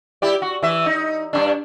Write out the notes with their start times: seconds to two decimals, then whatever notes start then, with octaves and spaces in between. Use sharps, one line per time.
0.22 E4 G4 D5
0.42 F#4
0.63 E3 E5
0.86 D#4
1.33 G2 C3 D4